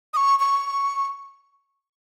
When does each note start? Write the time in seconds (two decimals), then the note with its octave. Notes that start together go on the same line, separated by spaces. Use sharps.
0.14 D#6
0.17 C#6
0.40 C#6